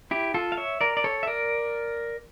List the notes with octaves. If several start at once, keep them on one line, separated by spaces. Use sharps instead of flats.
E4 G4
F4 A4
F5
C#5 E5
A#4 D5
D5
A4 C#5
E5
A#4 D5